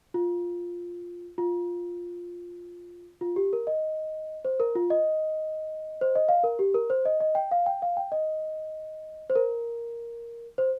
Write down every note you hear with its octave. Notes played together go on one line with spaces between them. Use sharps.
F4
F4
F4
G4
A#4
D#5
C5
A#4
F4
D#5
C5
D#5
F5
A#4
G4
A#4
C5
D#5
D#5
G5
F5
G5
F5
G5
D#5
C5
A#4
C5